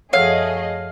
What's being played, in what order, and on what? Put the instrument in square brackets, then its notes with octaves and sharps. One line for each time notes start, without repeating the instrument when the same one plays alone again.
[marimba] F#2 F3 F#5 [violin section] A3 G#4 D#5 [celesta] C#5 [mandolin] F5